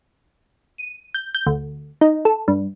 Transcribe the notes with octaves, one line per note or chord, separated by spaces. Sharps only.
D#7
G6
G6
D2
D#4
A4
G2